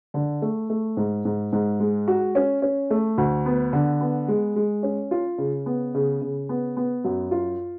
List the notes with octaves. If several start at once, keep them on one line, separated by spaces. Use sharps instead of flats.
D3
A3
A3
G#2
G#2
G#2
G#3
F#4
C#4
C#4
A3
D2
B3
D3
B3
G#3
G#3
C#4
F4
C#3
B3
C#3
C#3
B3
B3
F#2
F4